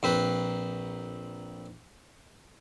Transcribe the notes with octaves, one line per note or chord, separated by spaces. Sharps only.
A#1 C4 B4